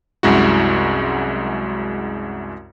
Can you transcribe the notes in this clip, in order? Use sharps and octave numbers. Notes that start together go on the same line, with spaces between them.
C2 F#2 G#3 E4 F#4